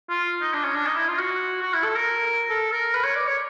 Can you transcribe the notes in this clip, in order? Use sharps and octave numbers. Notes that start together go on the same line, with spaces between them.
F4
D#4
D4
C#4
D4
D#4
E4
F4
F#4
F#4
E4
A4
A#4
A4
A#4
B4
C#5
D5
C#5